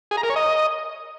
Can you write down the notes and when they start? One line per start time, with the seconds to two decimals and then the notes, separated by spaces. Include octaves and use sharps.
0.11 G#4
0.17 A#5
0.23 A#4
0.30 C#5
0.36 D#5